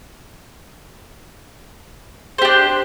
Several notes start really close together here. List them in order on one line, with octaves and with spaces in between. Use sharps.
C5 G4 D4